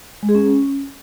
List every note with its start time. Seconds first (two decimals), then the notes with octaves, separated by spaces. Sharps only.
0.23 G#3
0.29 G#4
0.35 C#4